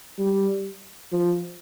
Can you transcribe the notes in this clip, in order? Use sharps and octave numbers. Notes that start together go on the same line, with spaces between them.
G3
F3